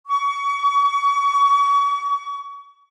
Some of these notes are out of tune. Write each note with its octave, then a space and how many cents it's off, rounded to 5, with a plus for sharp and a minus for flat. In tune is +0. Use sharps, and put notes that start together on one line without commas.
C#6 +35